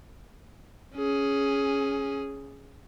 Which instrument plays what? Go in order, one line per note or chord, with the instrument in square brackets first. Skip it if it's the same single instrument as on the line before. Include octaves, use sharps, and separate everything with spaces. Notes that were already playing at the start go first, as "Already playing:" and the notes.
[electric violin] C#4 G#4